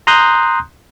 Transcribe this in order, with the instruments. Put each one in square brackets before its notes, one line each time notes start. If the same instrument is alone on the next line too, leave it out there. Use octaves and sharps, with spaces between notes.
[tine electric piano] A#5 C6 D#6 F#6 G6